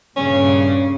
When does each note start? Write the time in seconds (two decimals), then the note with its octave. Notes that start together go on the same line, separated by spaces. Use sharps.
0.16 G2 A#2 C#3 C#4